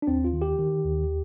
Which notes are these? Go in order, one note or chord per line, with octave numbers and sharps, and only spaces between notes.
D4
D#2 C4
F4
D#3
G4
D#3
D#2